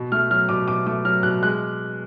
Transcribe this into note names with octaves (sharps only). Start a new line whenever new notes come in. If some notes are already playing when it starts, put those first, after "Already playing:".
Already playing: B2
A3 F6
F#3 F6
B2 D6
B2 D6
A3 D6
F#3 F6
B2 F#6
G#3 F#6